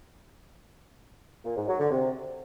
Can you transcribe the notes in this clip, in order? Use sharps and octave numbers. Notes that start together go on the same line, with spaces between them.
A#2
G#2
F#3
D3
C3